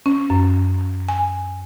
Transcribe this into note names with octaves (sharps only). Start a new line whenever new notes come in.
C#4
F#2
G#5